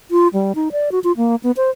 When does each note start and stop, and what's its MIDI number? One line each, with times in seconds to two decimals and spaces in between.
0.11 0.28 65
0.33 0.52 55
0.55 0.69 63
0.72 0.92 74
0.92 0.99 66
1.04 1.12 65
1.17 1.36 58
1.43 1.51 59
1.57 1.70 72